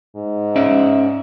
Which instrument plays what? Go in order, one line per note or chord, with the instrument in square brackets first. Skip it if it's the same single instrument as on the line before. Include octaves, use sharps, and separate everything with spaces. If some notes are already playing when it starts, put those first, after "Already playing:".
[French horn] G#2
[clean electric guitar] C#4 D5 E5